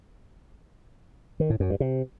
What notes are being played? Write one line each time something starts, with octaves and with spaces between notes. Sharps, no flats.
D#3
A2
F#2
G2
C3